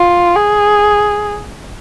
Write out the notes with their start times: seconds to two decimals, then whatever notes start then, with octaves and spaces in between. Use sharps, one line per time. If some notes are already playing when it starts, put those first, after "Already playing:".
Already playing: F4
0.36 G#4